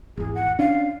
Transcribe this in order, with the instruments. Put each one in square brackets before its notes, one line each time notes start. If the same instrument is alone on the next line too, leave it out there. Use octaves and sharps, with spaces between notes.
[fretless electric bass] G#1 E2 [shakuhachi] G#4
[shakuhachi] F#5
[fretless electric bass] C#4 D4 [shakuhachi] F5